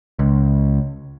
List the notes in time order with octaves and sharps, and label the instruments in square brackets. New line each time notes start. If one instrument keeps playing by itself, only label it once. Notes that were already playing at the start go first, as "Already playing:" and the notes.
[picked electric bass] C#2